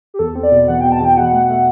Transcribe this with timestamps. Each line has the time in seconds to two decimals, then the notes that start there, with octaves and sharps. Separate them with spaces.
0.14 G4
0.19 E2 A4
0.35 C4
0.43 D5
0.52 B2
0.68 E2 F#5
0.81 B2 G5
0.92 A5
1.01 E2 G5
1.17 B2 F#5
1.33 A3
1.50 A3